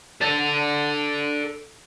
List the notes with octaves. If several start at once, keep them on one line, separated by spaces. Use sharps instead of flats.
A4 D5